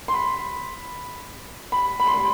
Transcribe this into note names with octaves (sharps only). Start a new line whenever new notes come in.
C6
B5
B5
B5
C6
B5